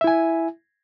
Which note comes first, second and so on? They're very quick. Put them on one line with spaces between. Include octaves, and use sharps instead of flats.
E5 E4 G#5